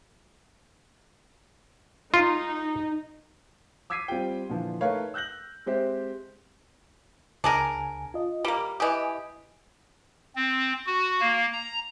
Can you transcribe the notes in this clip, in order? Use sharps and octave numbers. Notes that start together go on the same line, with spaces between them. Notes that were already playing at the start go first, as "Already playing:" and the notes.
D#4 F4
D6 E6 G#6 B6 C7 D#7
G3 C4 F4 G4 G5
A#2 D3 E3 F3
A3 D#4 A#4 B4 C#5 F5
E6 F#6 G6 A#6 F#7
G#3 C4 G4 C5 E5
C#2 D4 G#4 A#4 G#5
F4 D#5
G3 A#3
E3 G4 D#5 G#5 D#6
C4
F#4
A#3
A#5